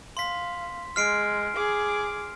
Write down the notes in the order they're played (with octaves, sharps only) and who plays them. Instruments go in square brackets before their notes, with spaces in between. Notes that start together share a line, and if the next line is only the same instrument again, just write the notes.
[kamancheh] F5 [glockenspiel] C6 B6
[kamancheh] G#3 [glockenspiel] F6 C7 D7
[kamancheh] G#4 D6